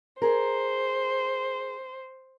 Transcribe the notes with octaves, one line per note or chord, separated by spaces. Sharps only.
G#4 A#4 C5